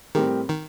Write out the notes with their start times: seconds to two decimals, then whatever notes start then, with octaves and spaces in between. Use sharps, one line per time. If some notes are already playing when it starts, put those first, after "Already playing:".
0.15 A2 D#3 G3 C4 G4 A#4
0.49 D#3